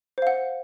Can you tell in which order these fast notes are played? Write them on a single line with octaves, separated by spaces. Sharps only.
C5 F5 F#5